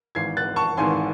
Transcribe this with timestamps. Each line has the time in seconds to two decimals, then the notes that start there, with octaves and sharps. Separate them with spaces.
0.15 G#1 G#2 E3 G#6 C7
0.37 F#6 A6
0.56 A5 C#6
0.77 G#1 G#2 E3 G#5 C6